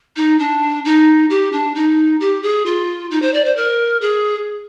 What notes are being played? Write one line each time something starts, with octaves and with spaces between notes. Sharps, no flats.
D#4
D4
D#4
G4
D4
D#4
G4
G#4
F4
D#4
C5
D5
C5
A#4
G#4